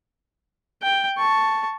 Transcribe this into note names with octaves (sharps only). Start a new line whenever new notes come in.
G5
A5 C#6